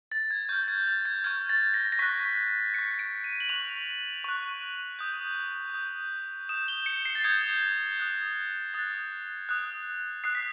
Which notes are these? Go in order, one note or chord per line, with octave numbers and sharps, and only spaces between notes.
A6
G#6
G#6
C#6 F6 G6
A6
G#6
A6
G#6
C#6 F6 G#6
A6
A#6
A#6
C#6 F#6 B6
C#6 F#6 C#7
D7
D#7
F#7
C#6 F#6 F7
C#6 F#6
D#6 G6
D#6 G6
D#6 G6 E7
G7
C#7
C7
A6
D#6 G6 G#6
D#6 F#6
D#6 F#6 A6
D#6 F#6
D#6 F#6 C7
B6